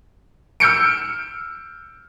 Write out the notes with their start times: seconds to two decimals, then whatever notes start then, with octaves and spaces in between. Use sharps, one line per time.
0.60 E6 F6 G6 C#7 D7